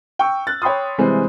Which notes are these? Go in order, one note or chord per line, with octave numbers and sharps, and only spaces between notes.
G5 C#6 E6
F#6 A6
C#5 G5 B5 C6 D#6
C3 E3 G3 G#3 C4